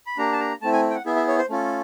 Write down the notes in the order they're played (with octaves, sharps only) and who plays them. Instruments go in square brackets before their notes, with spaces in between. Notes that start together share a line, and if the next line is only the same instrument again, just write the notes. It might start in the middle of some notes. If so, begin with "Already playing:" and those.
[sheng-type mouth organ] B5
A#3 D4 G4 A#5
A5
A#5
A3 C4 E4 A5
G#5
G5
F#5
B3 E4 G#4 E5
E5
C#5
C5
A3 C#4 F4 A4